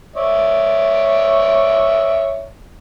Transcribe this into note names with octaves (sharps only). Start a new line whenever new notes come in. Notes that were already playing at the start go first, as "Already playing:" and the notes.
C#5 D5 E5